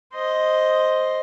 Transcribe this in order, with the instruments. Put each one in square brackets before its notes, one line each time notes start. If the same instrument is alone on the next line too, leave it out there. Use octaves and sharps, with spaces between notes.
[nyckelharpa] C5 D#5